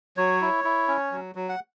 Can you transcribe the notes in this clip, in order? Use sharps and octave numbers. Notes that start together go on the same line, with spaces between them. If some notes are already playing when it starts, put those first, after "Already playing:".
F#3 C#5
E4
E4
C#4
F#3
F#3
F#5